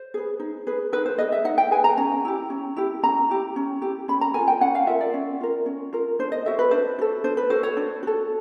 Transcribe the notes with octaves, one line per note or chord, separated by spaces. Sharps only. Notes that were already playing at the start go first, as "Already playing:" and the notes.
Already playing: C5
G#4 B4
D#4
G#4 B4
D#4 B4
C5
G#4 B4 D#5
E5
D#4 F#5
G5
G#4 B4 G#5
A#5
C#4 A#5
E4 G4
C#4
E4 G4
C#4 A#5
E4 G4
C#4
E4 G4
C#4 B5
A#5
F4 A#4 G#5
G5
C#4 F#5
F5
F4 A#4 E5
D5
C#4
F4 A#4
C#4
F4 A#4
D4 C5
D#5
F#4 A4 E5
B4
D4 C5
F#4 A4
D4 C5
B4
F#4 A4 C5
C#5
D4
F#4 A4